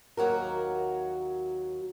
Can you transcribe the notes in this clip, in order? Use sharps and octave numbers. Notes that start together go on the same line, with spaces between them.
D#2 F#3 F#4 A#4